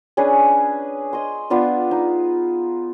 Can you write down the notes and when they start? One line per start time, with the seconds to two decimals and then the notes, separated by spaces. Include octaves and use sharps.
0.17 C#4 D4 G#4 B4
1.13 D#5 C6
1.50 B3 D4 F4 B4
1.91 D#4